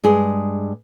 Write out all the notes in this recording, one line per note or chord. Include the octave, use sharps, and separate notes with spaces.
G2 G#3 G#4